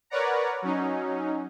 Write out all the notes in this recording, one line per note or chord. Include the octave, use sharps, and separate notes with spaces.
A#4 B4 C#5 D5 F#5 A#5
F#3 C#4 D#4